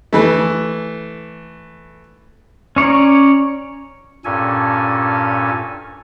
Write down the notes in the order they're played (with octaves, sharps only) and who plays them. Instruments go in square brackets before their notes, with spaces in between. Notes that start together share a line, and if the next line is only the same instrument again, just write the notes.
[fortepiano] E3 A3
[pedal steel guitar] C#4 C#5 D5 A#5
[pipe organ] G2 A#2 C#4 A4 G#5